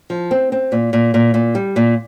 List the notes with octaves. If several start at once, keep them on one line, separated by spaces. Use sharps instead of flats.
F3
C4
C4
A#2
A#2
A#2
A#2
G3
A#2